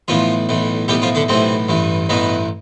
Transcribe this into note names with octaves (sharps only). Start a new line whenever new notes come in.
B1 A2 E3 F3 F4
B1 A2 E3
B1 A2 E3 G3 G4
F3 F4
D3 D4
B1 A2 C3 E3 C4
A1 G2 E3
A1 G2 B2 E3 B3